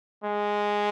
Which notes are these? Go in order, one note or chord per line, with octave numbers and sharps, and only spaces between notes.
G#3